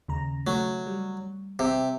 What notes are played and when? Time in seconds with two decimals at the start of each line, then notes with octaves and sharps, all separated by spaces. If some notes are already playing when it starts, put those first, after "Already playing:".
0.08 D#2 C#3 A#5
0.47 F#3 A3
0.87 G3
1.59 C3 E5 G5